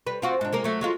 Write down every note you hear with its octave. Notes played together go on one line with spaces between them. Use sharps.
G3 B4
C4 F4 F#4
G#2 D4
G#3 A#3 A#4
F#3 A3
F#3 G#3 F4